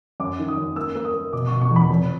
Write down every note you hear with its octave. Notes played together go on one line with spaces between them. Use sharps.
F#2 D6
D#3
D#6
F#2
A#3 E6
A#3
D#6
A#3
B2 D6
B2 C#6
C#6
E2
B5
F1